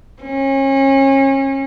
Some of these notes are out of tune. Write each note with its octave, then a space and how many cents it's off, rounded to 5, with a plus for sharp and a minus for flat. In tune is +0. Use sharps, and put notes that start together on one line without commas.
C#4 -35